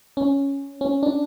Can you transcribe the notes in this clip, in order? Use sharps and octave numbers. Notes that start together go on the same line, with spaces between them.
C#4
C#4
D4